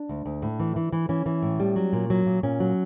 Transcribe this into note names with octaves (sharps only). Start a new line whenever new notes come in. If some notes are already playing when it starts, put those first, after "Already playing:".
Already playing: D4
D2
D2
A2
E3
E3
E3
E3 C#4
E3
A2
G3
F#3
A#2
F#3
A#2
A#2 C#4
F#3